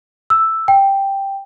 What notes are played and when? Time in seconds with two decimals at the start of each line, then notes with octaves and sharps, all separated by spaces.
0.30 E6
0.68 G5